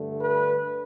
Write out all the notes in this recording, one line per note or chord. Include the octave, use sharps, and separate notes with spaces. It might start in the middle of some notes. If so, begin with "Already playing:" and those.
Already playing: G2 D3 A3
B4